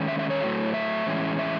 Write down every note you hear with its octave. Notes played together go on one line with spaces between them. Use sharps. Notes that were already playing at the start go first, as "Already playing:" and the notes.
Already playing: D#3 G#3 C#4
E5
E5
C#5
A2 F#3 A3
E5
A2 E3 G#3 C#4
E5